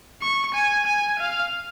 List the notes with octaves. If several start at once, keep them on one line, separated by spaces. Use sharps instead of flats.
C#6
G#5
G#5
F5